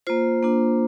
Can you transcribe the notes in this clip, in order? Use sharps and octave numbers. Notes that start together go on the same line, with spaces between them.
A#3 F4 C5
A#3 D4 F4